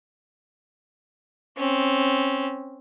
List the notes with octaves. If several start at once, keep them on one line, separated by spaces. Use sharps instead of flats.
C4 C#4